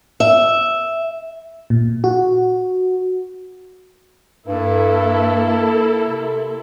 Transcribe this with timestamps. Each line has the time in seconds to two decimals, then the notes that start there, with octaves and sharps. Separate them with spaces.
0.20 E5
1.70 A#2
2.04 F#4
4.47 G2 A#3 E4 A4
6.04 C3